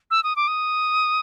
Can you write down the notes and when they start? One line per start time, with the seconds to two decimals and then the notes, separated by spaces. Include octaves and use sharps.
0.11 E6
0.24 D#6
0.36 D6
0.48 D#6